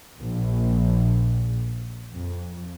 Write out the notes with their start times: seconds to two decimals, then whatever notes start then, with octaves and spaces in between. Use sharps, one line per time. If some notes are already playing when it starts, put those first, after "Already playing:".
0.20 A#1
2.13 F2